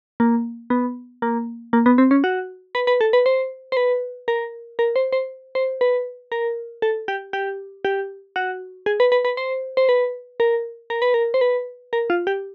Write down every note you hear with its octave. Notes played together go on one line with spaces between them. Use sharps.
A#3
B3
A#3
A#3
B3
C4
C#4
F#4
B4
B4
A4
B4
C5
C5
B4
A#4
A#4
C5
C5
C5
B4
A#4
A4
G4
G4
G4
F#4
G#4
B4
B4
B4
C5
C5
B4
A#4
A#4
B4
A#4
C5
B4
A#4
F4
G4